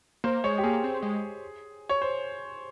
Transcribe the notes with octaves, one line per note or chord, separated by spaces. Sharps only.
A#3 C5
G#3 C#5
G4
A#3 G#4
C4
G#3
C#5
C5